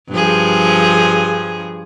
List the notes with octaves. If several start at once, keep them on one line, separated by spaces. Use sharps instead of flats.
G2 F3 G#4